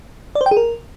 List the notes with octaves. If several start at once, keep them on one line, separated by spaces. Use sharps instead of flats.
D5
C5
G5
G#4
A#4